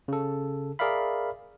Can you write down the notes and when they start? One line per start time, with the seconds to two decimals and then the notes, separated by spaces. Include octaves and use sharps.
0.08 C#3 A4
0.79 G#4 A#4 D5 E5 F5 B5